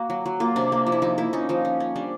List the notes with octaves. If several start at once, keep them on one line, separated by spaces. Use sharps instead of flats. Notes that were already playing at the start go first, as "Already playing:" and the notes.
Already playing: A#3 F#4
F#3
F#3
A#3 F4
C3 D4
A#3
F3
E4
F3 D#4
A#3 E4
C#4 D#4
F3 D#4
C#4
C#4
G3 D4